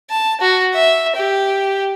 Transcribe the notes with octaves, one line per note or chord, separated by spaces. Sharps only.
A5
F#4
E5
G4